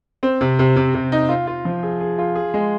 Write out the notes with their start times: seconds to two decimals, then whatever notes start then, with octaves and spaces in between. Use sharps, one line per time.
0.23 C4
0.41 C3
0.59 C3
0.76 C3
0.94 C3
1.12 D#4
1.29 F4
1.47 F4
1.65 F3
1.83 G#4
2.00 G#4
2.18 F4
2.35 G#4
2.54 G#3